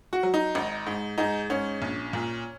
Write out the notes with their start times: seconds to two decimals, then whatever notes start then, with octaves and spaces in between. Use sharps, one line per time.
0.13 F#4
0.23 F#3
0.34 D#4
0.55 G#1
0.86 G#2
1.18 G#2 D#4
1.50 G#2 C#4
1.82 A#1
2.13 A#2